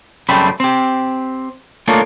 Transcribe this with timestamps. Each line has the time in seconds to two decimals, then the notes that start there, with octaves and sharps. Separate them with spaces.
0.29 F#2 C#3 G3 A3 C4 B5
0.60 C4 G4
1.88 A3 A#3 D4 D#4 F4 C#5